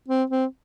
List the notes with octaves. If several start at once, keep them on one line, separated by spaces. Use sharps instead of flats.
C4
C4